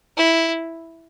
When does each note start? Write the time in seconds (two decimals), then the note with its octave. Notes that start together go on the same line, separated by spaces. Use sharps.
0.17 E4